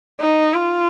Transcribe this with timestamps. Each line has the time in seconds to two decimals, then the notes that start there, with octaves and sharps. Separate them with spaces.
0.21 D#4
0.54 F4